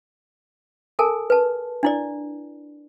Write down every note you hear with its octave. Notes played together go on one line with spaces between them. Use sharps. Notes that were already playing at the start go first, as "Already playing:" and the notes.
A4 A#4 G#5 A5
B4 A5
D4 E4 D5